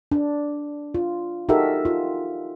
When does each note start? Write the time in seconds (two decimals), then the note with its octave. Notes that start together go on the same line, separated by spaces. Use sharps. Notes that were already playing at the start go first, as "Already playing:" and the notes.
0.11 D4
0.94 F4
1.49 D#4 F#4 G4 A4 A#4 E5
1.85 F4